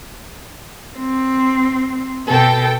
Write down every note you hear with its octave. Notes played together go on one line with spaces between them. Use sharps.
C4
B2 A4 G5